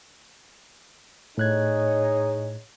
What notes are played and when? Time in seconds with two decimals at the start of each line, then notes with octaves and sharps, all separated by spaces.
1.38 A2 D#4 G#4 C#5 F#6 G#6